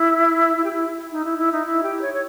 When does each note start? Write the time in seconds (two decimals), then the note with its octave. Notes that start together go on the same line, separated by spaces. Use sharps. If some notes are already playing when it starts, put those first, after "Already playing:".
Already playing: E4
0.57 E4
0.64 G4
0.71 E4
1.12 D#4
1.25 E4
1.38 E4
1.52 D#4
1.65 E4
1.83 G4
2.01 C#5
2.14 C#5